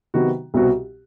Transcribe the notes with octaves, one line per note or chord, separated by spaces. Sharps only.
C3 D#3 F#3 B3 F#4
C2 B2 G3 C4 F#4